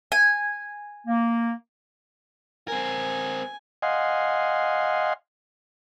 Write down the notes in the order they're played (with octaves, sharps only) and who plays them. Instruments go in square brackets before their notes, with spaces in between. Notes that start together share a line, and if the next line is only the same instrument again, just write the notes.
[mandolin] G#5
[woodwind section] A#3
[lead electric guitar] C4 A#4 [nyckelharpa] G#5
[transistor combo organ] D#5 F5 F#5 G#5 C6